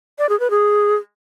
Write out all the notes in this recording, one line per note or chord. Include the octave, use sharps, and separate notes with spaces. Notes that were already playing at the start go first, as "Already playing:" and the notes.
D5
G#4
B4
G#4